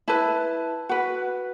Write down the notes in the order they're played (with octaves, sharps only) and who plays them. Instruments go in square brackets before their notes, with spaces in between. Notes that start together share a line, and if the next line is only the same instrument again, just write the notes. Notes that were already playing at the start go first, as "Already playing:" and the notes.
[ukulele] E4 B4 A5
F#4 B4